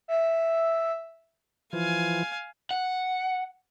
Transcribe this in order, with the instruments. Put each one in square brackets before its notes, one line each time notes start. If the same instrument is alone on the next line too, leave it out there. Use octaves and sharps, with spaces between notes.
[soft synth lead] E5
[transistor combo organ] E3 F3 [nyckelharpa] F5 G#5
[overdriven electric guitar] F#5